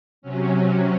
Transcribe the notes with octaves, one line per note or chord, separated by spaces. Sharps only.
C3 F#3 C#4